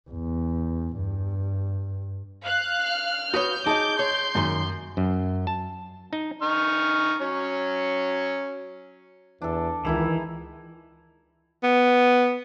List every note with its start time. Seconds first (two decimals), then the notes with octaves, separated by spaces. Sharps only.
0.10 E2
0.97 G2
2.45 F5 F#6
2.82 F6
3.34 F#4 B4 C#5 D#6 G6
3.66 D#4 G#4 D#5 A5 D6 D#6
3.99 C#5 C6
4.35 F#2 A#2 D#3
4.97 F#2
5.47 A5
6.13 D#4
6.42 D#4 C#6 F6
7.21 F#3 C#4 C#5
9.42 E2 E3 D4 A4
9.85 C#2 D#3 E3 D#4 E4 G#4
11.63 B3